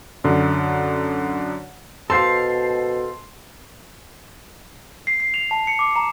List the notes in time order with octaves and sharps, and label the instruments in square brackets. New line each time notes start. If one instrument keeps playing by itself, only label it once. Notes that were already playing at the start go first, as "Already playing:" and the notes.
[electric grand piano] F#2 D3
[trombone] B2 [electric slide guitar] A4 C5 F5 [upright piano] C6
[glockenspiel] C7
C7
F7
A5
C#7
D6
A#5